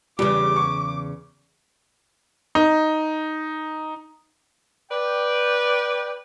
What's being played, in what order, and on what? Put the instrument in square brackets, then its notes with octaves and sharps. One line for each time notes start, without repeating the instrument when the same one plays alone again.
[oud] E2 C#3 [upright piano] G3 [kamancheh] D6
[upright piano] C#6
D#4
[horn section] B4 D5 G5